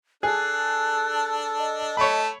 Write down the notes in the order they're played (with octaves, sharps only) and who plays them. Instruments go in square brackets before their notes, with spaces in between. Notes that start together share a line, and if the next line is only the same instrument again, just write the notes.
[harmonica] D4 [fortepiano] G#4 [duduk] A4 [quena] F#6
[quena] D#5
[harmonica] A3 A5 [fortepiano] C#5 B5